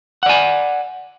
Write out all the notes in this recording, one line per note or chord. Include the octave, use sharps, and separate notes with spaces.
D5 F#5 G#5